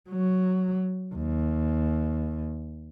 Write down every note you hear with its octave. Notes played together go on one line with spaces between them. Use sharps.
F#3
D#2